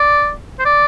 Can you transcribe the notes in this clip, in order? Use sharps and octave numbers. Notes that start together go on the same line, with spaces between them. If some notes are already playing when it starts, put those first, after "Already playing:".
Already playing: D5
C5
D5